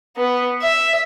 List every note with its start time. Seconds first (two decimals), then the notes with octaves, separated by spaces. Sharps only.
0.17 B3
0.62 E5